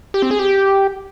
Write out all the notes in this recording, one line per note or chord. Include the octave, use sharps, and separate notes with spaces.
G4
C4
G#4
G4